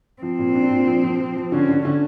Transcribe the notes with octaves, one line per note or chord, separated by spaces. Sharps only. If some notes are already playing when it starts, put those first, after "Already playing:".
F3 C4
A#2
D4
A#2
F3
F3
F3
F3
D3 C#4
D3
D3